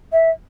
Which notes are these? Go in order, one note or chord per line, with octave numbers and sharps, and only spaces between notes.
E5